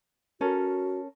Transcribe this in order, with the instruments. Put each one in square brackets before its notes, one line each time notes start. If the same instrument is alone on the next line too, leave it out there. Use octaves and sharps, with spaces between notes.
[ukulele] C#4 A4 A#4 [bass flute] F#4